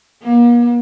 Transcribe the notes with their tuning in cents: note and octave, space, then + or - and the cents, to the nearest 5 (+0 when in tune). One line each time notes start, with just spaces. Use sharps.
A#3 +40